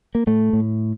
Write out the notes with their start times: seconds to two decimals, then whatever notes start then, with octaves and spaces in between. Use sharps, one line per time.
0.15 A#3
0.27 A2 A3
0.53 A2